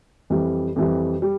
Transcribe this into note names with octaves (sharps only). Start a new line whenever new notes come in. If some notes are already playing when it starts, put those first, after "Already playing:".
F2 E3 G3
F2 E3 G3
G3